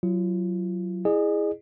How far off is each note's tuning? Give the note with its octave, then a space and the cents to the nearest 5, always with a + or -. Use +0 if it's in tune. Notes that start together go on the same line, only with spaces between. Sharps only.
F#3 +0 F4 -40
E4 +0 G#4 +0 D#5 -45